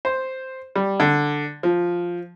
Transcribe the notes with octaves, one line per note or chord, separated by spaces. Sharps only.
C5
G3
D3
F3